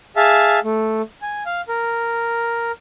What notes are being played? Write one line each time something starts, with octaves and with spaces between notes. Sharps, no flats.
G#4 E5 F5 A5
A3
G#5
F5
A#4